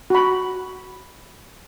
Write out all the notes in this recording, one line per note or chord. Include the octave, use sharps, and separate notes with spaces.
F#4 B5